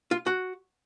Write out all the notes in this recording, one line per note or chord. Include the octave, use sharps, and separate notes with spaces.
F4
F#4